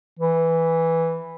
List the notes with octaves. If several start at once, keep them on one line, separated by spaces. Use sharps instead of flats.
E3